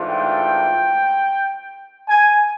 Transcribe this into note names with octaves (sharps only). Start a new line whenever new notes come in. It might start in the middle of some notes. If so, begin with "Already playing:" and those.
Already playing: G#2 E3 A3 D4 F4
G5
G#5